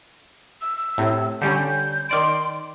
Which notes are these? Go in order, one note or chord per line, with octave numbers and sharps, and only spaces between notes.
E6
A2 C3
D3 G3 C#4 G6
D#3 D5 C6 D7